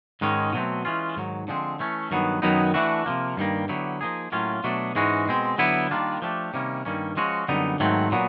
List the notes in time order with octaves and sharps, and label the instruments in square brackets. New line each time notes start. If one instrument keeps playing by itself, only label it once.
[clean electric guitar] G#2 D#3 G#3 C#4
B2 F#3 A3 C4
E3 G#3 C#4 F4
G#2 D#3 F#3
D3 F3 G#3 C4
E3 A3 C#4
G2 D#3 F#3 B3
F#2 D#3 F#3 B3 D#4
E3 A3 D4 F#4
C3 F3 A#3
G2 D#3 G3 A#3
D3 F#3 B3 E4 G4
F3 A#3 D#4 G#4
A2 F#3 A#3 C#4 F4
B2 F#3 A3 D4
G#2 E3 G#3 C#4 F#4
B2 G#3 C4
D3 F#3 B3 E4
D#3 G3 A#3 D4 F4
F3 A3 D4 G4
C3 D#3 G3 A#3 C#4
G2 D#3 G3 A#3 C#4
F3 G#3 C#4 F#4
F#2 D3 G3 B3 D#4
G#2 D#3 F#3 A3 C4
A#2 F#3 B3